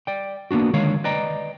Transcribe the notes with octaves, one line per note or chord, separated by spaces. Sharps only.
D5 G5
A#3 B3 D4 F#4
D3 D#3 G#3 C#5 F5
B4 D5 D#5 G5 A#5